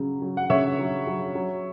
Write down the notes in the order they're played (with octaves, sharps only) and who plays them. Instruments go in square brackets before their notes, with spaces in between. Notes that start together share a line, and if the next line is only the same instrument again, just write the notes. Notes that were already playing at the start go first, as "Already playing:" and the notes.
Already playing: [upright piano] C#3 F#3
F#3
F#5
C#3 C#5 E5
F#3
F#3
F#3